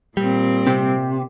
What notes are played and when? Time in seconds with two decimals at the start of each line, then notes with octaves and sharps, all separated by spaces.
0.17 A#2 G3 C4
0.67 C3